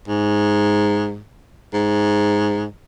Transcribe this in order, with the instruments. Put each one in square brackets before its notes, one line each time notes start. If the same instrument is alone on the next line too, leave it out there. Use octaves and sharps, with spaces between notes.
[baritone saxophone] G#2
G#2